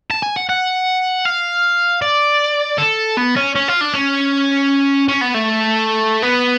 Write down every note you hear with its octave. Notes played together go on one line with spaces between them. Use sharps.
A5
G#5
F#5
F#5
F5
D5
A4
B3
C#4
C#4
F4
D4
C#4
C#4
B3
A3
B3